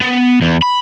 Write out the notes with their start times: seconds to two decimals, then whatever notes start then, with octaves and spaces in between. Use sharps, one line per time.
0.01 B3
0.41 E2
0.62 B5